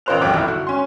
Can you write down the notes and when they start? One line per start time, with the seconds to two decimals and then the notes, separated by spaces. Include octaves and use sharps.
0.06 A1 F4 A#4 C5 F#6 F7
0.21 F1 B1 F#2 G5 D6 F#6
0.34 G1 E4
0.47 F#4
0.67 C#4 C6